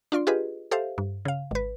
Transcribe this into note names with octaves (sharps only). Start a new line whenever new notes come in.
D4 F4 D5 C6
F4 G4 G#4 B4 D#5
G4 A4 C5 E5 F5
G2
C#3 F5
G#1 B4